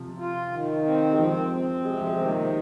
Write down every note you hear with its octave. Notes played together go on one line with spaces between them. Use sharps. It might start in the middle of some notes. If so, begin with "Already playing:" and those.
Already playing: C3 F3
F4
D#3
C4
G#3
F3 C4
C4
C3 G#3
F3
G#3
D#3
A#3